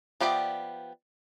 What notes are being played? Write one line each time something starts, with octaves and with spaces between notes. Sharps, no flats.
F3 B3 G4 D5 E5